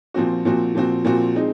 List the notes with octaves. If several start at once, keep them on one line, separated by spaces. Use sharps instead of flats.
A#2 F3 C4 F#4
A#2 F3 C4 F#4
A#2 F3 C4 F#4
A#2 F3 C4 F#4
G#3 C4 D#4